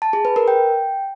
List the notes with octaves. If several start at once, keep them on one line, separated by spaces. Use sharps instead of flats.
A5
G#4
B4
A#4
G5